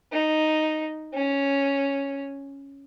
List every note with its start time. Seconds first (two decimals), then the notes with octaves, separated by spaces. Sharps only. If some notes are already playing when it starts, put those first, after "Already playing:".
0.12 D#4
1.14 C#4